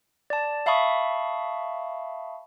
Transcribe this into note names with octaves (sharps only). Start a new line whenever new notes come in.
D5 A5
E5 F5 A5 B5 C#6 D#6